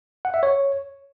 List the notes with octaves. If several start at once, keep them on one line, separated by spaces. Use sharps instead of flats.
F#5
E5
C#5